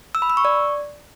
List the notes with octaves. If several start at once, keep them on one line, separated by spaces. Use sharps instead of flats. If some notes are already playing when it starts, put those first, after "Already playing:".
E6
B5
E6
C#6
D5